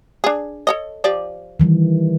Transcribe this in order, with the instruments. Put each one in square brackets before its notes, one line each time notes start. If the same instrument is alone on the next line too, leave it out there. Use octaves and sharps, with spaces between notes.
[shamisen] D4 G#4
A4 C#5 D#5
F3 G4 D5
[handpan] D#3 E3 G3